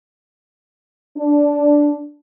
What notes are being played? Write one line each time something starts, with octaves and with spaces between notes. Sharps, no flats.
D4